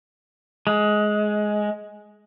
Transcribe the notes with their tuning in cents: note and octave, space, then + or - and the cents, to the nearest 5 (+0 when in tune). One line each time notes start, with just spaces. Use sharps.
G#3 +15